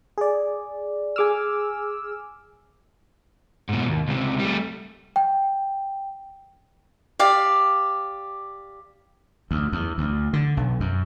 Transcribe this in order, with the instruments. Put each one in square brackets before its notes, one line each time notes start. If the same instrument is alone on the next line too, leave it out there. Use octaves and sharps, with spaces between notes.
[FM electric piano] G#4 D5
[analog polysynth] G#4 E6 [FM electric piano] G#5 D6 F6
[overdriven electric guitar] G#2 B2
D#2
C#2 C3
G3 A3
[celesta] G5
[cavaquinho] G4 D5 F5
[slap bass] D2
E2
D2
D3
B1
F#2